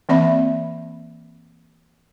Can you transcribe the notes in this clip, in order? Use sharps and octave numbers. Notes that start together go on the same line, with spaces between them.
E3 A#3 C4 D5 E5 B5